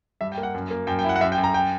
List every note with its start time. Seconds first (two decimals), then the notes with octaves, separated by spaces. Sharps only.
0.21 G2 E5
0.32 G5
0.38 A#3
0.43 F#5
0.54 F#2
0.71 A#3
0.87 F#2 G5
0.99 G5
1.04 E4 F#5
1.16 F#5
1.21 F#2 E5
1.32 G5
1.38 F#2
1.44 A#5
1.54 G5